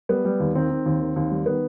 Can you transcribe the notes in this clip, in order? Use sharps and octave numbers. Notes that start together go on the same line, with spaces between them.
G3 B3
G3
D#2
D#3 C4
D#3
D#2
D#3
D#2
G3
D#3 B3